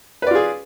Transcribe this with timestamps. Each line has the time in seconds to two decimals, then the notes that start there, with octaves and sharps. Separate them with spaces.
0.22 B4
0.27 D5
0.31 F4
0.35 G#4